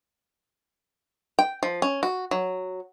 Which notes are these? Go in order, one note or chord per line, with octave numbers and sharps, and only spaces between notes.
G5
F3
C#4
F#4
F#3